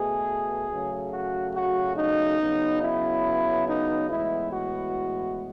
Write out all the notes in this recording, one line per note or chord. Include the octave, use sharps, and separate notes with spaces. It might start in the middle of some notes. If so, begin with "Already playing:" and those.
Already playing: B2 A3 G#4
C#3 F#3 A3
F#4
F#4
D#4
C#3 F#3 B3
E4
D#4
A2 E3 G#3 B3 E4
F#4